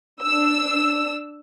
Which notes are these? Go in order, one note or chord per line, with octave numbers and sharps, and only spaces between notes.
D4 E6